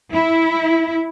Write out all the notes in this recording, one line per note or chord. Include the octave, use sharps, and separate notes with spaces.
E4